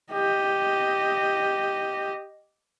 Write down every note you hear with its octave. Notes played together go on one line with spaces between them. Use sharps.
G4 D#5